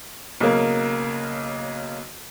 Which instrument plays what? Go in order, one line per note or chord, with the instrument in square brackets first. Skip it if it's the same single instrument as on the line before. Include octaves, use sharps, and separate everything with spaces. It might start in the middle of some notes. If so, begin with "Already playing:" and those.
[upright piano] B1 C#3 A#3